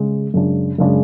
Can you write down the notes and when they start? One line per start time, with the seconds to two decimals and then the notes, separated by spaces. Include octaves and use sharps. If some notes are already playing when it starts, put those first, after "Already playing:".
Already playing: C#3 G#3
0.34 F#2 C#3 G#3 D4
0.78 F#2 C#3 G#3 D4